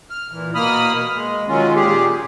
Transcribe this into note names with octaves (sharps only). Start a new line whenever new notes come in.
F6
A#2 E3
B2 A#3 B5 D#6 F6
G#3
D#3 F#3 G#3 C#4 F4
A#2 G4 G#4